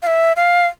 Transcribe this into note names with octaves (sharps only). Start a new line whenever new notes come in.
F5
E5
F5